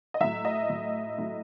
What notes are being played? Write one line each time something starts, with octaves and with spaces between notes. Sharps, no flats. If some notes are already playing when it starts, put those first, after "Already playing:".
D#5
A2 F#3 E5
D#5
A2 F#3
A2 F#3